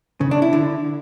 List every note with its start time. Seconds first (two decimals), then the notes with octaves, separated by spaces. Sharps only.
0.21 C#3
0.31 D4
0.42 E4
0.53 D3